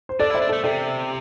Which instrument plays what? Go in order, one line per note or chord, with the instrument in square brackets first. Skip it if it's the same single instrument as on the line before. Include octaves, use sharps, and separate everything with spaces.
[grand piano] C5
[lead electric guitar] D4 [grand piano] A4 D5
[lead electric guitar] E4
[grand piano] C5 E5
[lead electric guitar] D4
[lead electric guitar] A3 [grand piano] A4 D5
[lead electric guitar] C3 [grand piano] A4 D5